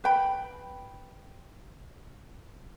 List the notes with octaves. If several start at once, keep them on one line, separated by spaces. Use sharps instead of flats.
B4 G5 B5